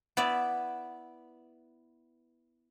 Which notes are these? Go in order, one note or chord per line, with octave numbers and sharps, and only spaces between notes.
B3 E4 B4 D5